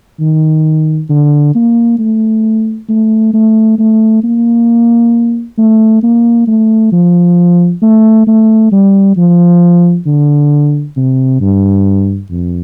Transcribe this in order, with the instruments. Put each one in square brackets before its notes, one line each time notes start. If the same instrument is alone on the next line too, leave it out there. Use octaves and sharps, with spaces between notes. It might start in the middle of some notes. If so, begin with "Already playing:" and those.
[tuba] D#3
D3
A#3
A3
A3
A3
A3
A#3
A3
A#3
A3
F3
A3
A3
G3
F3
D3
C3
G2
F2